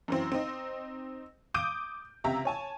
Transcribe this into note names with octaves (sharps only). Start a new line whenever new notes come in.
F#2 E3 C4
C4 D#4
D6 D#6 G6 D7 D#7
C#2 C3 G4 E5 A#5
C#5 G#5 A5